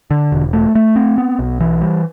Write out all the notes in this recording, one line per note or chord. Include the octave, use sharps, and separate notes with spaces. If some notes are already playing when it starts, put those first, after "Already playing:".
D3
E1
A3
A3
C4
B3
B1
E3
G3